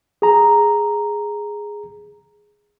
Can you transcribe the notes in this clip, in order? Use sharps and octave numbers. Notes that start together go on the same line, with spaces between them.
G#4 A#5